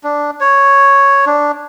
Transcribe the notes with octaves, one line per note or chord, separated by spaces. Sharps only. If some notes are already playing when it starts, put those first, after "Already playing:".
D4
C#5
D4